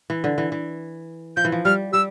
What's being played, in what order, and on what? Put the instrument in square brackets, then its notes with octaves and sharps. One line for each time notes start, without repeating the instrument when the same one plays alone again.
[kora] E3
D3
E3
E3
[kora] F3 [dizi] G6
[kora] E3
F3
[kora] G3 [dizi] F6
[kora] G3 [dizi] E6